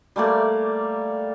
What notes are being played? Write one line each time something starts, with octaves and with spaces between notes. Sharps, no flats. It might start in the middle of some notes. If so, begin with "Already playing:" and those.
G3 A3 A#3 D5